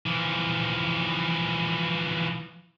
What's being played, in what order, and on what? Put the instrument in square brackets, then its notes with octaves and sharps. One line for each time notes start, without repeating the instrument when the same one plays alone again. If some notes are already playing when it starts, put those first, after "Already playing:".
[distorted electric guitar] E3 F3